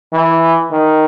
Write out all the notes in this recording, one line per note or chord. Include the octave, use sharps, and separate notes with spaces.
E3
D#3